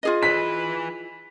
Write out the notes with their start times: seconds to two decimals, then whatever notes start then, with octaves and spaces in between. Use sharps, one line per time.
0.03 F4 G#4 D#5
0.23 E3 B4 B6